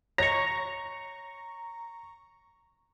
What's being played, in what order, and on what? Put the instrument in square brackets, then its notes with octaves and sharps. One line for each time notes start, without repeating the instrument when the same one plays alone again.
[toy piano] C#5 D#5 [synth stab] A#5 C#6 [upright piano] A#6